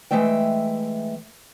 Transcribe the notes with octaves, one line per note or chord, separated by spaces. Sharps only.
E3 G#3 A3 E5 G5